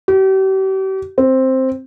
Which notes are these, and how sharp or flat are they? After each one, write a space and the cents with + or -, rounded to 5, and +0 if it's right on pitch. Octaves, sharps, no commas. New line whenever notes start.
G4 -40
C4 +5